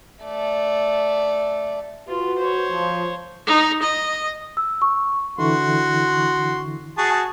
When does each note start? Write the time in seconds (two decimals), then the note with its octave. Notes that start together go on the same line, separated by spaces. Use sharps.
0.24 A3 D5
2.08 F4 F#4 B4
2.38 C5 C#5
2.69 F3
3.47 D#4
3.82 D#5
4.57 E6
4.82 C#6
5.38 D3 E3 E4 F#4 C6
6.98 F#4 G#4 A5